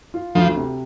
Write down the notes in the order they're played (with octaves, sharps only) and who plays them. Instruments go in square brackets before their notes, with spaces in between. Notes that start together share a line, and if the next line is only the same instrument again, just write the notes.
[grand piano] F4
[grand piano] D2 [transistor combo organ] F3
[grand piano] C3